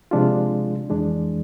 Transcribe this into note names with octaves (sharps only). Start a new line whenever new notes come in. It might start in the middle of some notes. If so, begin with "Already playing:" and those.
C3 F3 G#3 D4 F4
F2 E3 G#3 D4